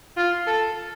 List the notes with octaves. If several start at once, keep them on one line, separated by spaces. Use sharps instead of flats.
F4
A4